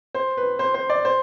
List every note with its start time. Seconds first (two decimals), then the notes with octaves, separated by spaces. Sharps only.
0.15 C5
0.37 B4
0.59 C5
0.74 C5
0.90 D5
1.05 C5